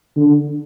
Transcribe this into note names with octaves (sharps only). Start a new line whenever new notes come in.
D3